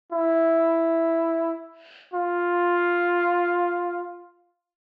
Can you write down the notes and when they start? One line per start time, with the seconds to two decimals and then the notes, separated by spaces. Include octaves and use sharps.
0.12 E4
2.14 F4